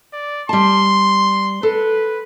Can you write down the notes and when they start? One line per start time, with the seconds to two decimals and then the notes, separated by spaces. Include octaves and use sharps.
0.13 D5
0.49 G3 A5 C6
1.63 A4 B4